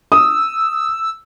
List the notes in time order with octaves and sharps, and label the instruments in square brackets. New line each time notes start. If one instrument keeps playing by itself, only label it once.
[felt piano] D#6 [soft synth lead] E6